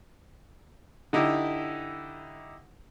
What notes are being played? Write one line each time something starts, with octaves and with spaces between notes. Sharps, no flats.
D3 D#4 E4 G4